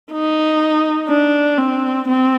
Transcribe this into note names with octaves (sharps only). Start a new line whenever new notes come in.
D#4
D4
C4
C4